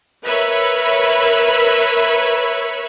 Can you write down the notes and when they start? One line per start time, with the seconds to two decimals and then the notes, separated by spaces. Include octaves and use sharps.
0.25 A#4 B4 C#5 E5 B5